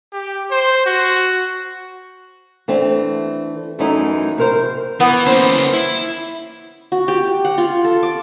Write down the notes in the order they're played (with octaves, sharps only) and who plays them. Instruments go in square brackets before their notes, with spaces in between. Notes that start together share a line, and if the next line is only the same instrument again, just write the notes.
[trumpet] G4
C5
F#4
[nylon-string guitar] E3 A3 C4 D4
F#2 E3 F#3 A3 D#4 E4
C3 A#4 C5
[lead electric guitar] E3 [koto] B3
[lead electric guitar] A#3 C#4 [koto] C5
[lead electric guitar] E4
[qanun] F#4
G4
F#5
F4
A4
D6